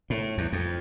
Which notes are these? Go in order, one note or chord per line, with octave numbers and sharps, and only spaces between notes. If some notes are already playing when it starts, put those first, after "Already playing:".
A2
E2
F2